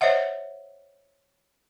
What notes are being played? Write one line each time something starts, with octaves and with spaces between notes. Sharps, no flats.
C5 C#5 D#5 E5 F#5